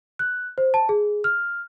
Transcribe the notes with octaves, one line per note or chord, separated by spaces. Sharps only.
F#6
C5
A5
G#4
F6